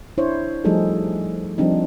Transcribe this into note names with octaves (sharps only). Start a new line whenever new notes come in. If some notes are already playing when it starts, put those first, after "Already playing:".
D4 E4 C5 C#5
F3 G3 A3 D#4 G#4 A4
F3 G3 C4 D4 D#4